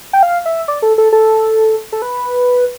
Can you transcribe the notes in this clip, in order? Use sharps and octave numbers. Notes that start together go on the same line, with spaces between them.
G5
F5
E5
D5
A4
A4
A4
A4
B4